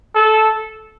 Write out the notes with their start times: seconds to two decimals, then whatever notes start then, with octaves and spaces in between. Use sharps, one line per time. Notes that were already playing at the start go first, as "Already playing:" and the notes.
0.15 A4